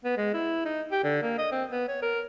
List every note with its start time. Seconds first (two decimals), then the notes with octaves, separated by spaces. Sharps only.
0.04 B3
0.17 G#3
0.33 E4
0.65 D#4
0.91 G4
1.04 D3
1.22 A#3
1.38 D#5
1.52 C4
1.71 B3
1.88 C#5
2.02 A#4